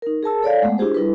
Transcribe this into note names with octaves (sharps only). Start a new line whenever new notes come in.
D#4 A#4
G#4 A#4 A5 E6
A4 C#5 D5 F5
G#3 A3 B3 F#5
D4 E4 F4 G4 G#4 C5
G3 E4 A4 B4